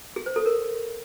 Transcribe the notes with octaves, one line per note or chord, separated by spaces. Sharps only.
G#4
C5
A4
A#4